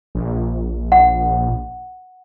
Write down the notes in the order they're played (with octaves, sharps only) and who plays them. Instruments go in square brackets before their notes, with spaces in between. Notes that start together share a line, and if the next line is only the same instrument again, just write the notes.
[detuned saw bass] A#1
[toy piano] F#5